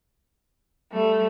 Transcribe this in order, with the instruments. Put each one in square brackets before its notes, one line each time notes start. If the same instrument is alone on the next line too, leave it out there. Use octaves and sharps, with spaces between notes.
[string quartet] G3 A3